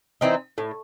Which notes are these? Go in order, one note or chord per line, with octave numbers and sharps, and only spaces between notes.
E3 C4 D#4
A2